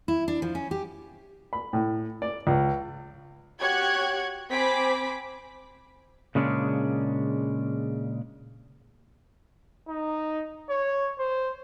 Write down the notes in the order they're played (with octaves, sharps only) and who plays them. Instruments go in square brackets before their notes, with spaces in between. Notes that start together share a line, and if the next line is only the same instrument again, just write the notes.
[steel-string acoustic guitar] E4
D4
F3
C#4
G4
[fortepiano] B5
A2
D5
C#2
[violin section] F#4 G4 C#5 C#6 F#6 G#6
C4 C5 G#5 B5 D6 B6
[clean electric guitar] A#2 C#3 G#3 C#4 D4
[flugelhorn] D#4
C#5
C5